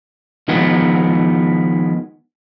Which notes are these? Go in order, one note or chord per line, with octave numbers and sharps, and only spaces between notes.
D#3 F3 G#3 B3